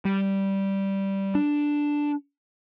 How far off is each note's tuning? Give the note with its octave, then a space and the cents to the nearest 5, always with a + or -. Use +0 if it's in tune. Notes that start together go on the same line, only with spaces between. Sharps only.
G3 -5
D4 +0